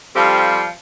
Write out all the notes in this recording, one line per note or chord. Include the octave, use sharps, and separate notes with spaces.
F3 G3 C4 G4 A4 F5